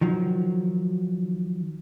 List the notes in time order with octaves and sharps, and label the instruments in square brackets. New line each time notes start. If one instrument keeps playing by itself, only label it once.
[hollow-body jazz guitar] D#3 F3 F#3